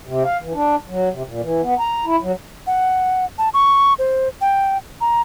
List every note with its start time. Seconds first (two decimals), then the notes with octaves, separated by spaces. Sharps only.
0.07 C3
0.25 F5
0.42 E3
0.54 D4
0.89 F#3
1.13 C3
1.27 A#2
1.42 E3
1.62 B3
1.79 A#5
2.05 E4
2.22 F#3
2.67 F#5
3.38 A5
3.54 C#6
3.99 C5
4.41 G5
5.01 A#5